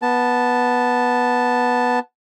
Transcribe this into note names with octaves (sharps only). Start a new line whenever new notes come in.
B3 A5